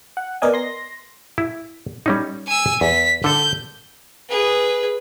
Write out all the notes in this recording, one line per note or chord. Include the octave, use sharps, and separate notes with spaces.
F#5
B3 A#4 D5 D#5 G#5
C6 A#6
E4
G3 C#4 D#4
G#5 E6
E2 B6
D3 A4 G6
G#4 B4